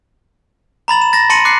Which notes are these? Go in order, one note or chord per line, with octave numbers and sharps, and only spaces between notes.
A#5 B5 A6 F#7
E7
A6 A#6 E7
A5 C6 A#6 C#7 D#7 F#7
D6 F#6 C7 C#7